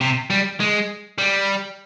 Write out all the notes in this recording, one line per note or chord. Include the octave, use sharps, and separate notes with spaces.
C3
G3
G#3
G3